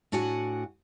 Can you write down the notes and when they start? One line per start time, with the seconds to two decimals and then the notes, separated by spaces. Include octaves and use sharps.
0.12 A2 D4 F#4 F#5 G#5